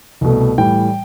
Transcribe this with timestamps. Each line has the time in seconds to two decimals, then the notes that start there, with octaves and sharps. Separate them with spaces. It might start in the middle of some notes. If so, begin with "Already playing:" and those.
0.21 C2 B2 A3
0.58 A2 E3 G3 G5